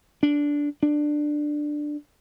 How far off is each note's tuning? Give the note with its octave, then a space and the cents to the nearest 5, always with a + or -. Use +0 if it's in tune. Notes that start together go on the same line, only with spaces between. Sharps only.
D4 -10
D4 +10